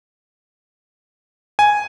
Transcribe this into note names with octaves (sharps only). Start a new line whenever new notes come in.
G#5